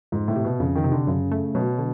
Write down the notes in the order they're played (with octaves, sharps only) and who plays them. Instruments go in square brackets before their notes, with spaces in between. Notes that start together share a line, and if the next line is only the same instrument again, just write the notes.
[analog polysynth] F2 [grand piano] G#2
[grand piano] A2
[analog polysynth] C3
[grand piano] B2
[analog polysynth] F2 [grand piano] C#3
[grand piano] D#3
[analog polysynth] C3
[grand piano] D3
[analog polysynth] F#2 [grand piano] C#3
[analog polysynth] A3
[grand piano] B2 [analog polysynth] F#3
[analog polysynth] D3